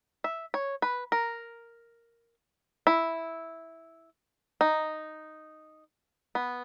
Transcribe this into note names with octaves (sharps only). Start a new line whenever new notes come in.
E5
C#5
B4
A#4
E4
D#4
B3